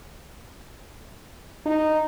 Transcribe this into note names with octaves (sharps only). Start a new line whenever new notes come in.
D#4